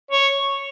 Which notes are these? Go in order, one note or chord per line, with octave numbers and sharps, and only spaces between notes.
C#5